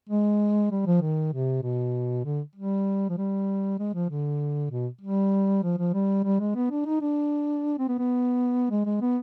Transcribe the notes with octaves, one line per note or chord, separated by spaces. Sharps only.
G#3
G3
F3
D#3
C3
B2
D3
G3
F3
G3
G#3
F3
D3
B2
G3
F3
F3
G3
G3
G#3
B3
D4
D#4
D4
C4
B3
B3
G#3
G#3
B3